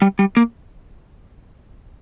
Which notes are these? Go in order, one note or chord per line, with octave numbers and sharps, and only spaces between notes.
G3
G3
A#3